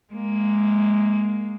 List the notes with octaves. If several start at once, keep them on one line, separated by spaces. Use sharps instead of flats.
G#3 A#3